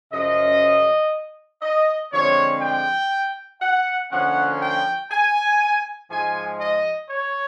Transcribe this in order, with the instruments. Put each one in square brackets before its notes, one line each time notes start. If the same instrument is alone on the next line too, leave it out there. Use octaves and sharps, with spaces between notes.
[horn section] F#2 C#3 F3 D#5
D#5
D3 F3 G#3 C4 C#5
G5
F#5
D3 F3 A#3 C#4 F#5
G5
G#5
G#2 F3 G#3 G#5
D#5
C#5